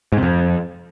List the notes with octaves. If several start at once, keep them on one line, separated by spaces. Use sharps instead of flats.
G#2
C3
F2